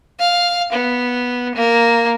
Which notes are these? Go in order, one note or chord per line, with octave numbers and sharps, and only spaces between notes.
F5
B3
A#3